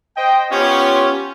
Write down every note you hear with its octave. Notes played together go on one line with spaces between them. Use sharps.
C5 D#5 G5
B3 C#4 F4 G4 C#5